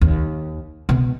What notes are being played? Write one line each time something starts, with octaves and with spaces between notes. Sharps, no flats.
D#2
B2